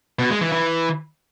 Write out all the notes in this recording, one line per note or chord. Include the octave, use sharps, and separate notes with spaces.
B2
G#3
E3
E3